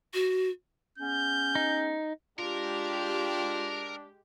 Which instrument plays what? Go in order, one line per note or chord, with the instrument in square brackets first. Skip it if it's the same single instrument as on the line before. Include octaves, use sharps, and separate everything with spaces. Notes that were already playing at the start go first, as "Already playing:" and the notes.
[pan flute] F#4
[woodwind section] G#3 B3 C#4 [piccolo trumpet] G6
[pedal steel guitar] D#4
[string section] G#3 G4 [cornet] D4 [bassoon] F4 [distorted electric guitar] A#4